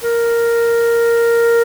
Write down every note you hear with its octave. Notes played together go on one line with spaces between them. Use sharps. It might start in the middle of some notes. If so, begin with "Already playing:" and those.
A#4